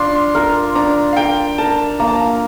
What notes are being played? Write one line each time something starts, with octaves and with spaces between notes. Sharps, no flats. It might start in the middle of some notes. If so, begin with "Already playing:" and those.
Already playing: D4 F4 C6
A#4
D4 A#5
F5
A#4 G5
A#4 A5
A#3 A#5
A5
A#5